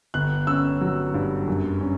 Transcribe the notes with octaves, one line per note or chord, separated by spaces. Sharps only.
G1 F#6
C#4 E6
F#3
G2
F#2
C#4